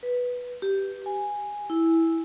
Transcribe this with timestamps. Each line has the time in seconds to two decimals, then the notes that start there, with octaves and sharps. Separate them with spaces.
0.03 B4
0.62 G4
1.06 G#5
1.70 E4